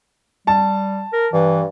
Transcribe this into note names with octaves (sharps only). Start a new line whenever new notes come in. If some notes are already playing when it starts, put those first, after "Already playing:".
G3 A5
A#4
G2 E3